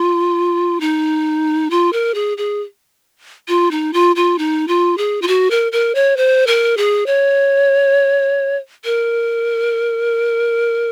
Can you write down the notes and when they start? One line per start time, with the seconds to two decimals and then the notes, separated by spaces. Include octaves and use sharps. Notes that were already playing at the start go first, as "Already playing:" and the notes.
Already playing: F4
0.80 D#4
1.70 F4
1.93 A#4
2.14 G#4
2.37 G#4
3.48 F4
3.71 D#4
3.93 F4
4.16 F4
4.38 D#4
4.68 F4
4.98 G#4
5.22 F4
5.28 F#4
5.50 A#4
5.72 A#4
5.95 C#5
6.17 C5
6.47 A#4
6.77 G#4
7.06 C#5
8.85 A#4